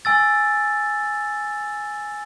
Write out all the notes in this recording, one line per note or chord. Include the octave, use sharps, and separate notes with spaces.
G#5 E6 A6